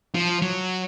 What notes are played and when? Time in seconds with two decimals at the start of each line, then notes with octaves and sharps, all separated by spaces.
0.15 F3
0.42 F#3